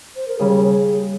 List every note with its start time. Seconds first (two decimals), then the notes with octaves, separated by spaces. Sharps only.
0.16 C5
0.28 A#4
0.39 D#2 C#3 G3 G#4